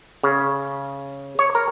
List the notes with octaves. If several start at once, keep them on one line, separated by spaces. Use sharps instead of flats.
C#3
C#5
A#4